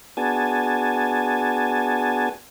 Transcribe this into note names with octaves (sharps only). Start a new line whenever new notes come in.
B3 D4 F#4 G#4 G#5 A5